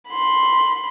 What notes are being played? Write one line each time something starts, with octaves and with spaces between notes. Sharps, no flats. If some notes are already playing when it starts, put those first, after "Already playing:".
B5 C6